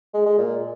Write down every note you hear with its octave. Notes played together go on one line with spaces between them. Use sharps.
G#3
G#3
A#2